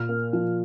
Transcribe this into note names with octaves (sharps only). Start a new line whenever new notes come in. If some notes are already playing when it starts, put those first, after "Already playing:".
Already playing: A#2 F6
A#3
F3